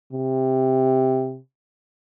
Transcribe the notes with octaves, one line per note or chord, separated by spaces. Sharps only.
C3